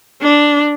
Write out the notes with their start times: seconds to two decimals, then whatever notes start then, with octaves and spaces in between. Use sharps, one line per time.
0.22 D4